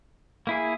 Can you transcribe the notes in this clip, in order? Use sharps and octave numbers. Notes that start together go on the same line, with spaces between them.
A#3 E4 G#4